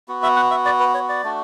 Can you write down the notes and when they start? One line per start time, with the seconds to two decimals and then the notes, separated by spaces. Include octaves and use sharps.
0.08 B3 F#4
0.23 E5
0.36 F#5
0.51 E5
0.66 D5
0.80 B4
0.95 C#5
1.09 D5
1.24 A3 D4 F#4